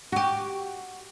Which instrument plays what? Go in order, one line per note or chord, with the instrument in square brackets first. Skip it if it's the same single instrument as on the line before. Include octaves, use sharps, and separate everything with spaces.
[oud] F#4 G4